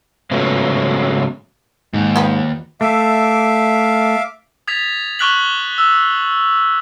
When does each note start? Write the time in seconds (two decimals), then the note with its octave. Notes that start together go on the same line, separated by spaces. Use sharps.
0.31 G#2 C#3 F3 F#3 A3 B3
1.93 D#2 G#2
2.16 F3 G3 B3
2.81 A3 E5 F5 D6
4.67 D#6 G#6 A6 B6 F7
5.19 C#6 D6 F6 F#6 B6 F#7
5.78 E6